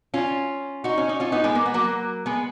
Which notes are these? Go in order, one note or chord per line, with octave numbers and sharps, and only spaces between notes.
C#4 F4
D#4 F#4
C#4
D#4
C#4 F4
B3 D#4
G#3 B3
A#3
B3
F#3 A#3
G#3 B3